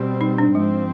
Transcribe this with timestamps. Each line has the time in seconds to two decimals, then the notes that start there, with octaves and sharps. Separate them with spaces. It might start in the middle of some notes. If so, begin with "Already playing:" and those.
Already playing: B2 G3 C4
0.21 D#4
0.38 D4
0.55 G#2 F3 G#3 C4